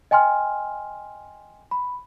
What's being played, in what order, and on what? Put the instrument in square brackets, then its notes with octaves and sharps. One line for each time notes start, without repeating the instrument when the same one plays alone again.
[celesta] D#5 G5 G#5 C6 F6
B5